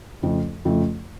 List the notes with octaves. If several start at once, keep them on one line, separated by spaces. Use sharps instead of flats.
F2 C#3 F3 A3
F2 C#3 F3 A3